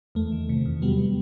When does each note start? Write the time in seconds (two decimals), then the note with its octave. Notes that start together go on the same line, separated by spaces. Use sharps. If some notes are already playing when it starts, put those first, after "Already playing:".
0.15 E2 A3
0.32 D#3
0.49 C3
0.66 E2
0.82 F#3 G3 B3